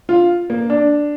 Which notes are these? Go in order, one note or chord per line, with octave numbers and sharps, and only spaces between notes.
F4
A#3
D4